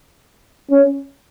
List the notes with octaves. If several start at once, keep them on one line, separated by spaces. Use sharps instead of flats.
C#4